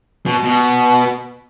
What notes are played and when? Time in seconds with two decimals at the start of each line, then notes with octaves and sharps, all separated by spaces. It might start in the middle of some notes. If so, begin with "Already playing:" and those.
0.26 B2
0.44 B2